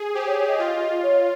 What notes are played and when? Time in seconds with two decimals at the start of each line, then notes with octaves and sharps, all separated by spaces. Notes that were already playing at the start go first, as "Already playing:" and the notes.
Already playing: G#4
0.14 G4 C5
0.26 C#5
0.36 C#5
0.47 D#5
0.59 F4
1.02 C#5